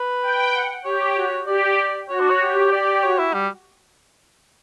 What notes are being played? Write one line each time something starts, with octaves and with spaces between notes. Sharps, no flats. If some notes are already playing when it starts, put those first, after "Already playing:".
Already playing: B4
G5
F#5
G4 C#5
F#4
G4 D5
F#4 C#5
D4
C#5
G4
D5
F#4 C#5
E4
G3